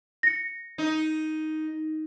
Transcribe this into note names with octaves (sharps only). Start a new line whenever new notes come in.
A#6 C#7
D#4